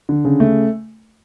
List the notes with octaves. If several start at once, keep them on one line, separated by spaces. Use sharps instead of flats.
D3
C#3
A3